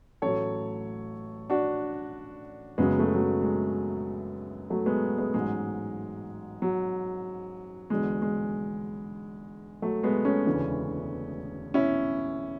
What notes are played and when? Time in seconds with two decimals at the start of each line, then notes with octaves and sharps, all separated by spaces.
0.22 A1 A2 F#3 A4 C#5
1.50 D4 F#4
2.78 F#1 F#2 C#3 F#3 G#3 B3
2.99 F#3 A3
3.14 F#3
3.21 G#3
3.42 G#3
4.70 F#3 A3
4.86 G#3 B3
5.18 G#3 B3
5.34 A1 G#2 F#3 G#3
6.62 F#3
7.90 E2 D3 F#3 G#3
8.22 G#3
9.82 F#3 A3
10.03 G#3 B3
10.25 A3 C#4
10.46 E1 D2 C#3 E3
11.74 C#4 E4